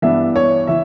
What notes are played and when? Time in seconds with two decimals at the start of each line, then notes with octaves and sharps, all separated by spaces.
0.02 G2 E3 B3 D4 E5
0.36 C#5
0.67 E3 E5